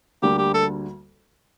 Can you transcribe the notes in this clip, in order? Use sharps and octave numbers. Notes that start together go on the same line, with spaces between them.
D2 D3 G3 A#3 G4
G4
A4